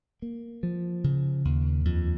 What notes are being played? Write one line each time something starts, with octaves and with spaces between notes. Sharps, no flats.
A#3
F3
C#3
D#2
F2